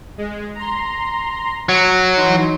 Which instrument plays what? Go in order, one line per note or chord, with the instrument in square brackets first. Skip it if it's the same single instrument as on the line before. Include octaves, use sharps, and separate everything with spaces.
[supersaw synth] G#3
A#5 C6
[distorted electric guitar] F#3
[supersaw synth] E3 D#4 C6